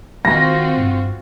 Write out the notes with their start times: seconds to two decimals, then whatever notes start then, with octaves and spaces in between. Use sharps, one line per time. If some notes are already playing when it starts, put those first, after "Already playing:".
0.25 D#3 C4 F4 F#4 A#6
0.78 G2